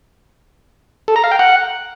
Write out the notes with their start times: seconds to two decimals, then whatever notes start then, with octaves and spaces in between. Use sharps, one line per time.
1.08 A4
1.16 A#5
1.24 F5
1.32 G5
1.39 F#5